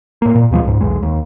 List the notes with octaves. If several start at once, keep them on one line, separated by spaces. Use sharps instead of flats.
A2 A#3
A#2
D#2 B2 F3 G#3
C#2 G#2
B1 E2 G#3
D#2